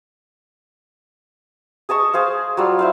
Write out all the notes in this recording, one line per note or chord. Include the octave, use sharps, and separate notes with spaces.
G#4 D#5 A5 C#6
G#4 C5 F5
F#3 G3 F4
E4 C5 F5